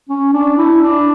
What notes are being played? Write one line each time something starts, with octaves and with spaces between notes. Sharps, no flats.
C#4
D4
E4
D4